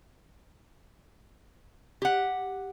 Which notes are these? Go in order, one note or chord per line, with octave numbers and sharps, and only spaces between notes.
G4 F#5